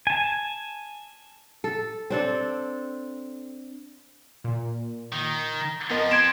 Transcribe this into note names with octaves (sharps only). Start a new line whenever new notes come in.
G#5 A5
A4
C4 D4 A4
A#2
D#3
F2 F3 B3 A#4 D#5
C6 G#6 D7 E7